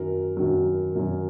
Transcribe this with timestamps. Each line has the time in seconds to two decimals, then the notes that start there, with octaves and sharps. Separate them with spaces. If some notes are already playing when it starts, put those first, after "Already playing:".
Already playing: F#2 D#3 F#3 A#4
0.37 F#2 D#3 F#3
0.95 F#2 D#3 F#3